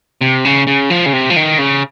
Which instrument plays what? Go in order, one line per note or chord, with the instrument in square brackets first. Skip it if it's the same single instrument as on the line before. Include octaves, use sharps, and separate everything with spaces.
[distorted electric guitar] C3
C#3
C#3
F3
C#3
C3
F3
D#3
C#3